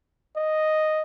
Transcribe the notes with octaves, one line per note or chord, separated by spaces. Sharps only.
D#5